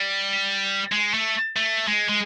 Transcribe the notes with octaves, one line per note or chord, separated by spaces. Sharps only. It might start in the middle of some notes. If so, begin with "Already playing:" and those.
Already playing: G3
G#3
A3
A3
G#3
G#3